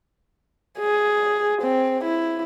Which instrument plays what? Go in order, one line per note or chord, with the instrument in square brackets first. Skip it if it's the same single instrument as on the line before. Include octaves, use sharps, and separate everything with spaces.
[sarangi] G#4
C4
E4